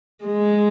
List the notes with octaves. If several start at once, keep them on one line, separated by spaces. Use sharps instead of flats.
G#3